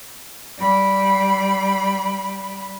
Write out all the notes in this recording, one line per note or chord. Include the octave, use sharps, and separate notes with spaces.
G3 B5